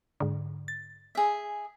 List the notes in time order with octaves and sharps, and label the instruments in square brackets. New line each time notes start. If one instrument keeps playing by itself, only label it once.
[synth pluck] G#2 D3
A6
[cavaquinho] G#4 E5